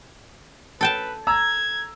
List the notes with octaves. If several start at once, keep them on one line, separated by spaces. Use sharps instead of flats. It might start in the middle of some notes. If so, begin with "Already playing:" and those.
A4 B4 G5 A5
A#5 E6 G#6